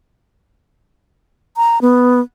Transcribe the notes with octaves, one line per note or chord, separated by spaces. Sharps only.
A#5
B3